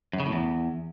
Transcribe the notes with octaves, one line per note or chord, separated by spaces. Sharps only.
F#2
C#3
A2
E2